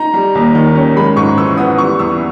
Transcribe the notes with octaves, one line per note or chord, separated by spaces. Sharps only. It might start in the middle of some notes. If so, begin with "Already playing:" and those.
Already playing: D#4 A#5
G3
D#2
D#3
C#4
G#3 B5
G#2 C#6
E3 E6
B3 D#6
G3 C#6
E2 E6